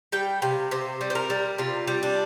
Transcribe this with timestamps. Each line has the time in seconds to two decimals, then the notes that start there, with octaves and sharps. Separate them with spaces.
0.12 G3 G5
0.42 C3 F5
0.71 C3 C5
1.01 G3
1.10 C5
1.15 A#4
1.30 G3
1.58 C3 F4
1.88 G3
2.03 D4